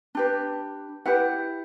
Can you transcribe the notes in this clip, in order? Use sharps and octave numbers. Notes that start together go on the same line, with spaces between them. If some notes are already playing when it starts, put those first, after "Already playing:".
D4 G4 B4
E4 G4 B4 F#5